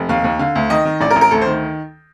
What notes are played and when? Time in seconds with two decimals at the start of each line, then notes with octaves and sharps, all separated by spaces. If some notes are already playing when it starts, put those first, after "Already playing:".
Already playing: F1
0.09 D#2 F5
0.24 D#2
0.39 D3 F5
0.55 D2
0.70 D#3 D#5
0.85 D#3
1.01 A1 D5
1.10 A#4
1.16 A1
1.21 A#4
1.31 D2 A4
1.41 C5
1.46 D#3